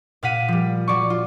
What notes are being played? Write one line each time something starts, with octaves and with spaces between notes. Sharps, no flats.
A#2 F5 F#5 B6 D#7
F3 G3
F#3 D5 C#6
F4